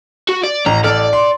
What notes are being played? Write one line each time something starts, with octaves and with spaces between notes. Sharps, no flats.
F#4
D5
A1 A#5
A1 A4 D5 F6
C6